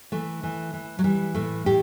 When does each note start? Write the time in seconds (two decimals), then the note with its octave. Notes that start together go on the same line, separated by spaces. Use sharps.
0.12 E3 A3
0.43 E3
0.74 E3
0.99 F#3
1.04 E3 G3
1.34 A2 A3
1.66 A2 G4